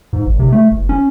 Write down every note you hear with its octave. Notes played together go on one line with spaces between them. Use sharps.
G#2
G#1
C3
A3
F#1
C#4